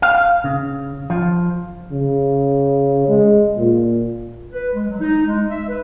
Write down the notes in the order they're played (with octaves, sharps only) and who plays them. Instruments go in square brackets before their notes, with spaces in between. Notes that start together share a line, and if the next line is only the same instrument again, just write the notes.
[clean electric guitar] F5
C#3
F3
[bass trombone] C#3
G#3
A#2
[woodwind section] B4
G#3
F#3
D#4
G#3
E5
B4